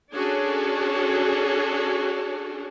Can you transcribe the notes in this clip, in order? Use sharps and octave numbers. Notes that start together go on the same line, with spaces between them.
C#4 D4 F#4 G#4 A4 C#5